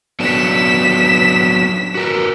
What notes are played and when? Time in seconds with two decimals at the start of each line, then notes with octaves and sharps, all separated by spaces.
0.20 F#3 B3 D4 B6 E7
1.95 F#4 A#4 B4